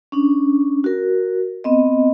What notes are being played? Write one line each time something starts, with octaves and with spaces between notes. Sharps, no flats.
C#4 D4
F#4 A#4
B3 C4 D#5